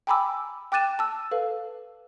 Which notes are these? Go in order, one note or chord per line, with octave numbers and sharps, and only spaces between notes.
G5 G#5 A#5 B5 D6 E6
G5 D6 F#6 A6 D#7 E7
A5 E6
A4 B4 F5